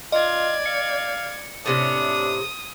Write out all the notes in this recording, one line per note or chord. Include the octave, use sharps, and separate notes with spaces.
F4 D5 D#5 G#6
F5 C#7
A2 C3 C#4 D4 D#6